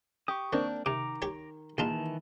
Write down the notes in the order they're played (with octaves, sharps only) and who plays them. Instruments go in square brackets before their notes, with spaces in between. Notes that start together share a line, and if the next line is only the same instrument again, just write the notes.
[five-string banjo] G4 [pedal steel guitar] C#6 D#6
[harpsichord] D#3 [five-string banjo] A#3 C4 D4
[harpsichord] C3 [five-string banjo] D#3 [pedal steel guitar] A#5 D6
[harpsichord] G4 C#5
[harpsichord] A#1 D#4 F4 [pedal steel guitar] D#3 E3 A5